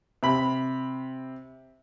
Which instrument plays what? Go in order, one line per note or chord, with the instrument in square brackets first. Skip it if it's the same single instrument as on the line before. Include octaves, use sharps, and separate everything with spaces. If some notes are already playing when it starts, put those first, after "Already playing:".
[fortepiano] C3 B5